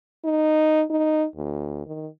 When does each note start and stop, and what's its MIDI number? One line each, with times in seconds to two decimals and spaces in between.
0.25 0.84 63
0.90 1.26 63
1.36 1.85 38
1.87 2.07 51